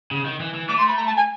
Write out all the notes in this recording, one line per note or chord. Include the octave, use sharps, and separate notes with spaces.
C#3
D#3
E3
E3
A3 D6
C6
B5
A#5
A5
G#5